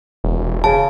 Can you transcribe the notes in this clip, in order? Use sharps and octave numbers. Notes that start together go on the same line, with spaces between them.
E1
C#3 A5